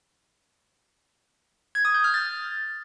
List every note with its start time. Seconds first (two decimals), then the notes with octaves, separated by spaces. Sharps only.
1.75 G#6
1.85 D#6
1.95 G6
2.04 F6
2.14 A6